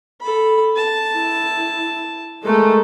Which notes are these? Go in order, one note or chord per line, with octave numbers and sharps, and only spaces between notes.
A4 B5
A5
E4
G#3 A3 A4 A#4